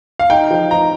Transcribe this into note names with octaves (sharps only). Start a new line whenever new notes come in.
F5
D#4 G5
F3
D#4 A#5